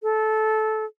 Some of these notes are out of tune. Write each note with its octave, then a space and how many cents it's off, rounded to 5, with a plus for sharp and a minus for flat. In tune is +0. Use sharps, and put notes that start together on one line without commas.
A4 -20